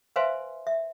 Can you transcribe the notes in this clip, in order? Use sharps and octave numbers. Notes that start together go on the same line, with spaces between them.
B4 C5 E5 F5 G#5 C6
E5